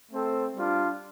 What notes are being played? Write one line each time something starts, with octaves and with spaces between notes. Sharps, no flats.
A3 C4 A4 C5
G3 D4 F4